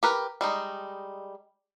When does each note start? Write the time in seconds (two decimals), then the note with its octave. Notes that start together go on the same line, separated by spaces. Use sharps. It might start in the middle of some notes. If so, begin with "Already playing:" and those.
0.03 G4 A#4 B4
0.41 G3 G#3 D#4